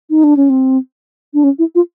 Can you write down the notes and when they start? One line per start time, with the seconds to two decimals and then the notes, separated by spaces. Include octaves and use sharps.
0.10 D#4
0.24 D4
0.37 C#4
0.50 C4
1.34 D4
1.44 C#4
1.59 E4
1.75 F4